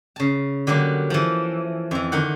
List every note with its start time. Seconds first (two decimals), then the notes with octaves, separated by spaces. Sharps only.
0.16 C#3 A5
0.67 D3 F#3 G3 A#3
1.10 E3 F3
1.91 F2 E3
2.12 D3 D#3 D#4 F#5